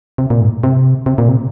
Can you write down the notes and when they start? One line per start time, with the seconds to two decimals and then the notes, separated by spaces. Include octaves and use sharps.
0.18 C3
0.30 A#2
0.41 G#2
0.64 C3
1.06 C3
1.18 A#2
1.29 C3